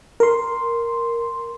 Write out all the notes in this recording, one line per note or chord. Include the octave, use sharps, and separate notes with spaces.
A#4 C6